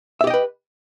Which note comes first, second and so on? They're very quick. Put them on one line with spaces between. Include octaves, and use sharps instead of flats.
E5 G4 D#5 G5 B4